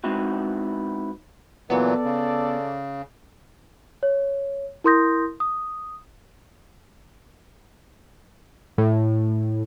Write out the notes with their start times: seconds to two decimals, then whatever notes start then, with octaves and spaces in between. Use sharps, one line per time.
0.04 G#3 B3 C4 D#4 E4 F#4
1.70 A#2 E3 F#3 B3 A4 D5
2.04 C#3
4.03 C#5
4.84 E4 A#4 C6 D#6 G6 A#6
5.40 D#6
8.78 A2